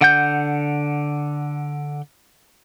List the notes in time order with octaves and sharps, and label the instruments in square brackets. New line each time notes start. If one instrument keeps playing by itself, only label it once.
[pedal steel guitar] D3 F#5 G6